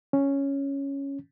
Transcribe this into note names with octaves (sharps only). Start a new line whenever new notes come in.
C#4